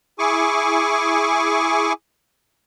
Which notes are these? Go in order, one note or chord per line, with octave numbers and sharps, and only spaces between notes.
E4 G#4 G#5 C#6 D6